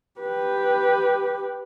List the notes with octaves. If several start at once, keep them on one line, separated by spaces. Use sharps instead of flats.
G4 B4